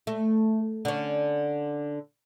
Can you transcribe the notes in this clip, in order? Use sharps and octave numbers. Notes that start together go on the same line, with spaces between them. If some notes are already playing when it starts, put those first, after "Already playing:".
A3
D3 C#4